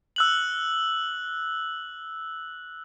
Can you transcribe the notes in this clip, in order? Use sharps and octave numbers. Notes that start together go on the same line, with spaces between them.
E6 F#6 F#7